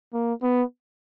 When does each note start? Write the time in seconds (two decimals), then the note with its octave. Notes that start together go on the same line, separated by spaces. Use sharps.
0.14 A#3
0.43 B3